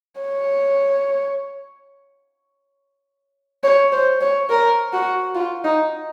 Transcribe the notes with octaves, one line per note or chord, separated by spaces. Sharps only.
C#5
C#5
C5
C#5
A#4
F#4
F4
D#4